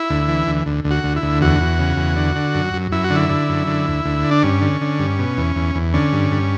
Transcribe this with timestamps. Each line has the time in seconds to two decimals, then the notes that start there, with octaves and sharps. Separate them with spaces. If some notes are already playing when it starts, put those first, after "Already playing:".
Already playing: E4
0.10 D2
0.28 E3
0.47 D2
0.66 D2
0.84 D2
0.91 F#4
1.04 D2
1.16 E4
1.23 D2
1.41 E2 F#4
1.60 E2
1.79 C#3
1.97 E2
2.16 D3
2.35 D3
2.54 F#2
2.74 F#2
2.92 F#2 E4
3.04 F#4
3.10 D3
3.16 E4
3.29 D3
3.49 F#2
3.67 D3
3.87 D2
4.05 D2
4.24 D3
4.31 D4
4.43 G2 C#4
4.61 D3
4.81 D3
4.99 G2
5.19 B2
5.37 E2
5.56 E2
5.75 E2
5.94 D3 C#4
6.13 G2
6.31 G2